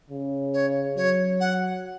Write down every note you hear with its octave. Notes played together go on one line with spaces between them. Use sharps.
C#3
C#5
F#3 C#5
F#5